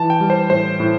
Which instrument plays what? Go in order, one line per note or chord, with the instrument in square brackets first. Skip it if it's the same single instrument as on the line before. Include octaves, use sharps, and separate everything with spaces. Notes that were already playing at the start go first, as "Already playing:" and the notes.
Already playing: [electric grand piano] E3 A5
G5
G3
C5
A2 C5
A2